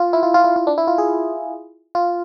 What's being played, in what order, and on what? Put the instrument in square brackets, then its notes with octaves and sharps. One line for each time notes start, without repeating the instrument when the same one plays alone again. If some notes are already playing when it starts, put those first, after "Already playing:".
Already playing: [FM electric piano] F4
E4
F4
F4
E4
F4
D4
E4
F4
G#4
F4